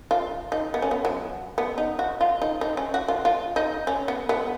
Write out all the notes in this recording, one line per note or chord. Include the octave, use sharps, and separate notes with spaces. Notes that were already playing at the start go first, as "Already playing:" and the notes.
F4
D#4
B3
C#4
B3
F#3
B3
D#4
F#4
F4
D#4
D#4
C#4
F#4
F4
F4
D#4
C#4
B3
B3